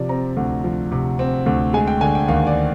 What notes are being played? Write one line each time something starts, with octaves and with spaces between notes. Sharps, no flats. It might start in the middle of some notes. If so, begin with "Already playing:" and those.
Already playing: C3 F3 D5
C4 A#5
D2
F3
C3
C4
D2
G#3 G#5
G5
D3 G#5
G5
D#2 F5
D5